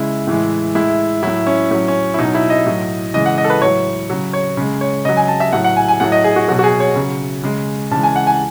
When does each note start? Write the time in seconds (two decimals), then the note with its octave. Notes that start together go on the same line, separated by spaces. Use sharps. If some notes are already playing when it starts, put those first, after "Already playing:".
Already playing: C#3 G#3 E4
0.27 A2 E3 G#3
0.75 A2 G#3 E4
1.23 A2 F#3 E4
1.47 C#4
1.71 A2 F#3 C#4
1.88 C#4
2.14 E4
2.19 B2 F#3 D#4
2.35 E4
2.50 D#5
2.66 A2 F#3
3.14 C#3 E3 G#3 D#5
3.26 F#5
3.38 D#5
3.44 A4
3.50 B4
3.62 A2 F#3 C#5
4.10 C#3 F#3
4.33 C#5
4.57 C#3 G#3
4.81 C#5
5.05 C#3 F#3 D#5
5.17 G#5
5.28 A5
5.40 E5
5.53 A2 F#3 F#5
5.64 F#5
5.76 G#5
5.88 G#5
6.00 A2 F#3 F#5
6.12 D#5
6.24 G#4
6.36 F#4
6.48 F#3 F#4
6.52 B2
6.59 F#4
6.64 G#4
6.80 C#5
6.96 C#3 F#3
7.43 C#3 G#3
7.91 C#3 E3 G#3 A5
8.03 G#5
8.16 F#5
8.27 G#5